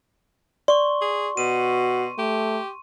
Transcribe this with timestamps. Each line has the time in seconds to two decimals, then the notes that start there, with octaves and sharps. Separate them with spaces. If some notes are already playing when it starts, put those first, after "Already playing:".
0.68 D5 C6 C#6
1.01 G#4
1.37 B2 F#4 D#7
2.18 A3 G4